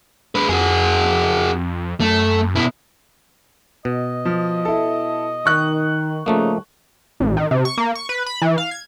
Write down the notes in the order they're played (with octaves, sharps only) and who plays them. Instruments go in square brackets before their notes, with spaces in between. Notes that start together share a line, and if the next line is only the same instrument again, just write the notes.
[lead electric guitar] G#3 B4
[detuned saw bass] F2 [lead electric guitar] F#4 G#4
[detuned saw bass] F#2 [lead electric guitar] A3
[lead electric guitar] B2 E4
[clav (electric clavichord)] B2 [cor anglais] D#5
[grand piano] F3
E4 A4
[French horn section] D#3 [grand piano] C#6 F#6
[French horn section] C#3 [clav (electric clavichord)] F3 A3 A#3 [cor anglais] D#4
[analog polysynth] A1
D#3
C3
C#6
A#3
C#6
B4
B5
E3
F5
G#6